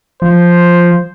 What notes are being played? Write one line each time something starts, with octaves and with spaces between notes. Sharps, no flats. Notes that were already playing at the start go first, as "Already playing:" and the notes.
F3 C5